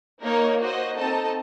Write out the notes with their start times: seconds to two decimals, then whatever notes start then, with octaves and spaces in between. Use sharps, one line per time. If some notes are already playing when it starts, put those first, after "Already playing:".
0.24 A#3 D#4 A#4 C#5
0.61 F#4 C5 D#5
0.98 C4 D#4 A4 D#5 A5